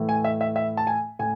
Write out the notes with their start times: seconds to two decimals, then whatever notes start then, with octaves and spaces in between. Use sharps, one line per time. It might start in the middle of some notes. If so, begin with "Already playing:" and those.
Already playing: A2 E3 A3
0.09 G#5
0.24 E5
0.41 E5
0.56 E5
0.77 A5
0.87 G#5
1.19 A2 G#5